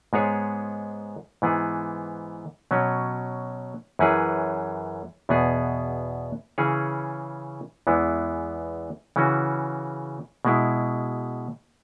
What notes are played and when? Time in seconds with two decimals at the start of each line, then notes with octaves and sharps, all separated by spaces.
0.13 G#2 G#3 B3 G#4 C#5
1.42 G#2 E3 B3 G#4
2.71 B2 F#3 C#4
3.99 F#2 E3 C#4 G#4 B4
5.29 E2 B2 B3 G#4
6.58 C#3 E3 C#4 G#4 C#5
7.87 E2 E3 G#3 B3
9.16 C#3 E3 C#4 F#4
10.45 B2 G#3 E4